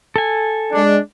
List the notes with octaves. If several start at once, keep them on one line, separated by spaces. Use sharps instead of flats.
A4 G#5
G#3 D4